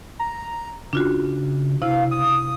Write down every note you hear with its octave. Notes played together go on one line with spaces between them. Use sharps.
A#5
C#3 D4 F4 F#4
C3 E4 F5
D#6